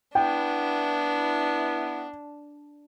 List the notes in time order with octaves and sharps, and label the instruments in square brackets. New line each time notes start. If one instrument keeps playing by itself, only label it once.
[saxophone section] B3 E4 [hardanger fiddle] D4 [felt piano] G5